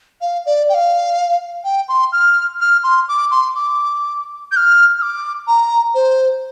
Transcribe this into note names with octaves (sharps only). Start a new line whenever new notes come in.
F5
D5
G5
F5
G5
C6
F6
F6
C6
D6
C6
D6
G6
F6
F6
D6
A#5
C5